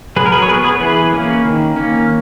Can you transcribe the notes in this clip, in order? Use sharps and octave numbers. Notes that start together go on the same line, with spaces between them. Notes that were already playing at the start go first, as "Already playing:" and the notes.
F#3 G#4 B4
A#4
G#4 B4
C#5
B3 G#4 B4
G#4 B4
E3 G#4 B4
A#3 C#4
D#3
A#3 C#4